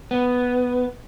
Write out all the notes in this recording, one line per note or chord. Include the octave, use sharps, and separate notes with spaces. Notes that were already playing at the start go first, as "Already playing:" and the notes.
B3